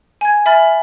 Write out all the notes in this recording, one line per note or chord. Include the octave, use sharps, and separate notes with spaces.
G#5 G#6
E5 G#5 B5 F6 A6